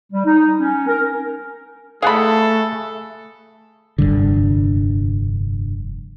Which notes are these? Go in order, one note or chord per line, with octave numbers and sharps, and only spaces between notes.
G3
D#4
C#4
A#4
A3 G#4 A4 F5 F#5 A5 B5
F1 B1 G2 D3